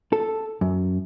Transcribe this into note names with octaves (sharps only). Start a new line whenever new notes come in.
A4
F#2